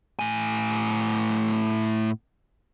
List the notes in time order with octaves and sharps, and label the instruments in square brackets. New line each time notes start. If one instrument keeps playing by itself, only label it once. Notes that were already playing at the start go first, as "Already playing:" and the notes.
[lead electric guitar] A2 G#5